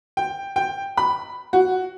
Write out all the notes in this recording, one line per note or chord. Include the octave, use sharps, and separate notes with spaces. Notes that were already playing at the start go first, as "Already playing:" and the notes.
G5
G5
B5
F#4